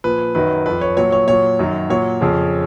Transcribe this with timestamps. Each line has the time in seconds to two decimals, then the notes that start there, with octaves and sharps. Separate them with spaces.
0.04 A#2 F3 B4
0.35 F#2 D#3 F#3 B4
0.66 F2 F3 B4
0.81 C#5
0.97 A#2 F#3 C#5
1.12 C#5
1.28 A#2 F#3 C#5
1.59 F#2 D#3 F#3
1.90 A#2 F#3 C#5
2.21 F2 C#3 F3